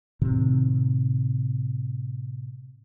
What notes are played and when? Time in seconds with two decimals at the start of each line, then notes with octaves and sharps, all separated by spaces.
0.22 A2 C3 D#3